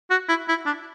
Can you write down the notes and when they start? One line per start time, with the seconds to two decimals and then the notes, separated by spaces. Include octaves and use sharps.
0.10 F#4
0.29 E4
0.48 E4
0.66 D4